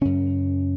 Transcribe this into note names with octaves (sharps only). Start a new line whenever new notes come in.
F#2 C#3 C#4